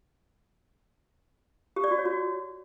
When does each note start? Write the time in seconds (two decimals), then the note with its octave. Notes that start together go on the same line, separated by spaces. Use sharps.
1.76 G4
1.84 D5
1.91 F#4
1.98 C#5
2.06 F#4